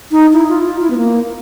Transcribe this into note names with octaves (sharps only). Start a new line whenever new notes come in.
D#4
E4
F4
F4
E4
B3
A#3